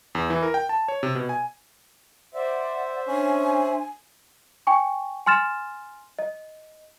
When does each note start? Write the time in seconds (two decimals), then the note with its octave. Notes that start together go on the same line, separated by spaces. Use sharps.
0.15 E2
0.30 E3
0.43 A#4
0.54 G5
0.69 A5
0.88 C#5
1.03 C3
1.15 B2
1.29 G#5
2.35 C5 D5 E5 F#5
3.08 C#4 D4 G#5
4.67 G5 G#5 C#6
5.26 G#5 C6 F6 A6 E7
6.19 D#5